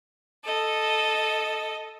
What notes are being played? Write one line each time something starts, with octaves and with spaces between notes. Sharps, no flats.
A4 D#5